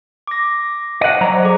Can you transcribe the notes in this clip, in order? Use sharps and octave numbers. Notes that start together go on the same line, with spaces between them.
D6 A#6
D#5 F#5
F#3 C5 D5 A#5
G#4 A4 D6